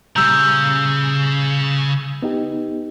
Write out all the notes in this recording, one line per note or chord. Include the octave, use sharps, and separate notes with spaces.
A#2 C#3 G3 A#5 E6 G6
B3 D#4 G4